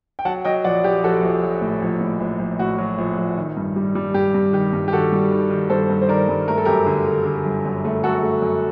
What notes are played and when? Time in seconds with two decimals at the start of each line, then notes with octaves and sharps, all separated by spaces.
0.19 G5
0.25 F#3 F#5 A5
0.45 F#3 D#5 G5
0.64 A#1 D5 F#5
0.84 A#1 G4
1.03 A#1 F#4 A4
1.23 A#1
1.43 F#3
1.61 A2
1.82 A#1
2.01 A2
2.20 A#1
2.39 A#1
2.59 A2 F#4
2.78 F#3
2.98 A#1
3.18 A#1
3.37 D#3
3.57 G2
3.76 G3
3.95 G3
4.14 G2 G4
4.34 G2
4.53 D#3 G4
4.73 G2
4.88 G4
4.93 D#3 F#4 A4
5.12 G3
5.31 D#3
5.50 D#3
5.70 G2 A4 C5
5.90 G2
6.02 C5
6.09 D#3 A#4 D5
6.29 G2
6.48 A3 A#4
6.58 A4
6.65 F#2 G4 A#4
6.86 D3
7.06 D3
7.25 D3
7.45 G1
7.65 F#2
7.85 A3
8.03 F#2 F#4 A4
8.23 A3
8.42 F#2